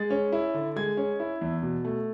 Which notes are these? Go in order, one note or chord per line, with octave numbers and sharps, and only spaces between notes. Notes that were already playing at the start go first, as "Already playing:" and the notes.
Already playing: G#3 A6
C#4
E4
D3
G#3 G#6
C#4
E4
E2
B2
A3